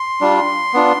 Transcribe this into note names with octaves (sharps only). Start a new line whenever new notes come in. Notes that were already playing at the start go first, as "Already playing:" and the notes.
Already playing: C6
G3 D4 F4
B3 D4 F4